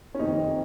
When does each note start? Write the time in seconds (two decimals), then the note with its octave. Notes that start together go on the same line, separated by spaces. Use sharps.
0.14 C#4
0.19 F#1 F2 C3 D#3 D#4